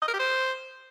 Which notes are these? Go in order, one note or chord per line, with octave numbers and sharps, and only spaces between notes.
D#5
A#4
G4
C5